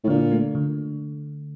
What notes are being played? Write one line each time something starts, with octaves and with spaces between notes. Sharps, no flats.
A2
A#2 D3
A3
D3